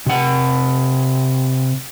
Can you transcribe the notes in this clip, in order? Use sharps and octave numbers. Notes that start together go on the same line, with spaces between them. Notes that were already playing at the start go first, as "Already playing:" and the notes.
C3 F#5